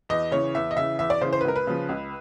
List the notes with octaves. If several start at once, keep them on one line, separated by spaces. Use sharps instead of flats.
E2 D#5
C#3 E3 C#5
E2 E5
D#5
C#3 E3 E5
E2 E5
D5
C#3 E3 C5
C5
B4
C#2 A#4
B4
C#3 F3
C#2